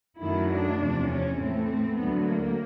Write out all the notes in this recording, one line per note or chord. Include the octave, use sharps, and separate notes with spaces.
F#2 D#3 F#3 A3 E4
D4
E2 C3 F3
C#4
A2 E3 A3 C4
C4
D2 D3 F#3 A3 B3
A#3